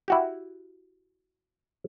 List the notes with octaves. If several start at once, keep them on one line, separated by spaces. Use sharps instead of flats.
E4 F#4 G4